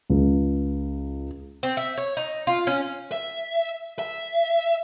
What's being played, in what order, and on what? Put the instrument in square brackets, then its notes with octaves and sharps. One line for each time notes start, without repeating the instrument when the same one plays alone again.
[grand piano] C#2
[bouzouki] C4
E5
C#5
D#4
F4
C#4
[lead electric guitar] E5
E5